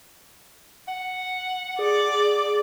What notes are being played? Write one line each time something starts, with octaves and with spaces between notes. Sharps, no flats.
F#5
G#4 D5